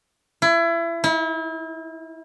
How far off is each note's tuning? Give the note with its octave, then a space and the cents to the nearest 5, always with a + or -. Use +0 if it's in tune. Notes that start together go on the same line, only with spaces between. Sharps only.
E4 +30
E4 -35